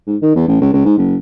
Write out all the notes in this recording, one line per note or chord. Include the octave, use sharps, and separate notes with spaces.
G#2
D#3
E2
A1
C#2
C#2
G#2
F#1